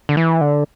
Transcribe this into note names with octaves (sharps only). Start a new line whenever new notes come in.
D3
E3
D3